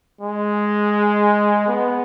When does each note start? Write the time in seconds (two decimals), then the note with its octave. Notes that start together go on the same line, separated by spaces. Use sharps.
0.21 G#3
1.68 B3